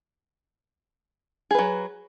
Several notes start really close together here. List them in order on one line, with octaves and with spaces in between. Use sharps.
G#4 B4 F#3